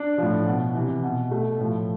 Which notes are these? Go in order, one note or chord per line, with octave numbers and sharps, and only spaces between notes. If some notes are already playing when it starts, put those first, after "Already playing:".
Already playing: D4
A2 F3
B2
C3 E3
B2
B2 A3
A2 F3